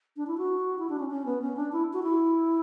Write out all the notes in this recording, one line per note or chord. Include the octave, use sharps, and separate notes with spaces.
D4
E4
F#4
E4
D4
C#4
C#4
B3
C#4
D4
E4
F#4
E4